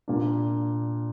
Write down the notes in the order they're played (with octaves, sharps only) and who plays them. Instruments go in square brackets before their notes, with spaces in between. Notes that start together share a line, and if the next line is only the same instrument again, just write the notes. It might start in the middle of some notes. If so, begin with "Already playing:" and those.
[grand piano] A#2 A#3 D4